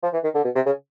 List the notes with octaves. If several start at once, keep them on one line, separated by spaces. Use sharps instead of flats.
F3
E3
D#3
D3
B2
C3
C#3